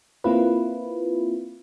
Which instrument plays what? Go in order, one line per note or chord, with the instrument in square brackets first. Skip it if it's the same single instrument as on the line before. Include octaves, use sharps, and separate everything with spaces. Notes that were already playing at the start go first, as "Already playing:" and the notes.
[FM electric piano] A#3 C4 E4 F4 B4